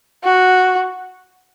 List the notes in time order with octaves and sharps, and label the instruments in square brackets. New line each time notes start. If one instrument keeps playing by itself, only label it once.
[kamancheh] F#4